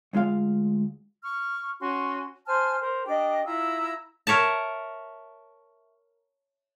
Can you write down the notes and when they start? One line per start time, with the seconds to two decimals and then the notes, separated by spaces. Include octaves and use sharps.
0.13 D2 G#3 F4 F5
1.22 C#6 F6
1.79 C#4 F#4 C6
2.46 C5 G#5 A5 F6
2.80 A#4 C5
3.07 D4 G4 D#5 D6
3.45 E4 F4 A#5 E6
4.27 A#4 C#5 E5 A5